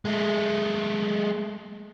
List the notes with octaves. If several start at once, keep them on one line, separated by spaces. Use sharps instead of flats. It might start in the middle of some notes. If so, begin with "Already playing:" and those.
G#3 A3